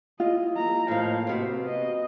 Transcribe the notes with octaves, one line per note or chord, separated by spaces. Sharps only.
E4 F4 D#5
A#3 A#5
A2 F3 A#3 D#5 F5
C3 B3 C4 F#4
D#5